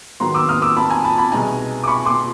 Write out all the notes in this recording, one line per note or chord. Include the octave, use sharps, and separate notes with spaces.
G#2 D#3 F#3 B3 A#5 C6
D6 E6
D#6 F6
D6 E6
A5 B5
G#5 A#5
A5 B5
A5 B5
C2 B2 G#3 B3 D#4 G#5 A#5
D6
B5 C#6
C6 D6